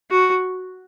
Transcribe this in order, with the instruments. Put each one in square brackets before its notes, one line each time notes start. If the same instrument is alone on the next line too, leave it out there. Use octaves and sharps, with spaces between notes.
[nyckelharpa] F#4